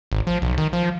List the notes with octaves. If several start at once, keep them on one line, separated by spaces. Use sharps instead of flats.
G#1
F3
B1
D#3
F3